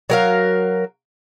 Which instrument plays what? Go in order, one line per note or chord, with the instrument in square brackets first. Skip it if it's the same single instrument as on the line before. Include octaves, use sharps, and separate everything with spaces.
[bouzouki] F#3 A#4 F5